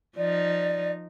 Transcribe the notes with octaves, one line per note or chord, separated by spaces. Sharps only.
F3 D#4 D5